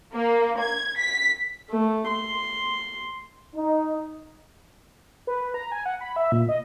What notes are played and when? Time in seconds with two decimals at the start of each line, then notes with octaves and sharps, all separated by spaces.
0.14 A#3
0.60 G#6
0.99 B6
1.70 A3
2.07 C6
3.55 D#4
5.27 B4
5.54 A#5
5.72 G#5
5.86 F#5
6.01 B5
6.16 E5
6.32 A#2
6.49 D#5